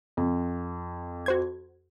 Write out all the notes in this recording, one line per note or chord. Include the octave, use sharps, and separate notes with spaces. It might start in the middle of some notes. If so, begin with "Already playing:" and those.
F2
F#4 C5 G#6